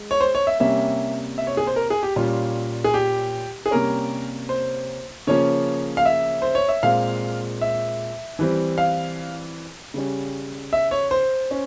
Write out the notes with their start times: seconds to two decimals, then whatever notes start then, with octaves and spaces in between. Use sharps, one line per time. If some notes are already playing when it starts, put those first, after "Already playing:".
Already playing: G#3
0.11 C#5
0.21 C5
0.35 C#5
0.47 E5
0.60 C3 G3 A#3 C#4 E5
1.38 E5
1.47 C#5
1.57 G#4
1.67 C5
1.76 A#4
1.90 G#4
2.03 G4
2.16 A#2 G3 C#4 F4
2.84 G#4
2.94 G4
3.66 G#4
3.71 C3 G3 A#3 C#4 A#4
4.49 C5
5.27 C#3 F3 A#3 C#4 C#5
5.97 F5
6.05 E5
6.42 C5
6.55 C#5
6.69 E5
6.83 A#2 G#3 C4 F5
7.61 E5
8.39 E3 G3 C4
8.78 F5
9.94 C#3 G3 C#4
10.73 E5
10.91 C#5
11.11 C5
11.51 C#4